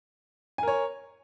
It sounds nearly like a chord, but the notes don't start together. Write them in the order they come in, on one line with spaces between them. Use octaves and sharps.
G#5 A#4 C#5